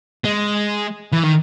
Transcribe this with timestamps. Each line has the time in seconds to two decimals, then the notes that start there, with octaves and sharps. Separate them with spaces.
0.25 G#3
1.12 E3
1.23 D#3